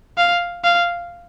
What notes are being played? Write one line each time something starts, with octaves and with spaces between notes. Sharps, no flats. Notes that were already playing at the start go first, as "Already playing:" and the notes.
F5
F5